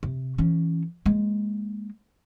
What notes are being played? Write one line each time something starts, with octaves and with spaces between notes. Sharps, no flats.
C3
E3 C#4
G#3 A#3